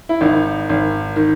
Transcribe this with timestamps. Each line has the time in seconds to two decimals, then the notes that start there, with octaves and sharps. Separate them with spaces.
0.09 E4
0.21 G#1 D#4
0.69 G#1
1.16 D#3